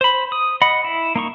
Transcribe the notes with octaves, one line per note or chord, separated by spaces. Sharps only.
C5 B5
D#6
D#5 F#5 B5
E4
A#3 D#4 C#6